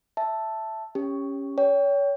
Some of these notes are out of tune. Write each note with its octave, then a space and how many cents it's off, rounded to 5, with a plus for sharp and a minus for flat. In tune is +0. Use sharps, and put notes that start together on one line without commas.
E5 +0 A5 +0
C#4 +0 G4 +15
C#5 +30 G5 +0